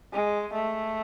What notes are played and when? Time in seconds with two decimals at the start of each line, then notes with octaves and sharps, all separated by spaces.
0.13 G#3
0.53 A3